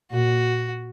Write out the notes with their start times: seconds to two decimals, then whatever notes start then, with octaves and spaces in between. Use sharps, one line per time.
0.12 A#2 F#4